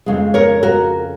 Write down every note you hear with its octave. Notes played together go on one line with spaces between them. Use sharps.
F2 C#3 G#3
A#4 C#5
F#4 A#4